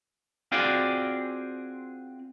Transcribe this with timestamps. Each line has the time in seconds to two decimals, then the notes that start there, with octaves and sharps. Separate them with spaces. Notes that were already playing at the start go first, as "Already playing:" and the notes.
0.52 C4 F4 F#4 G#4 C5 D5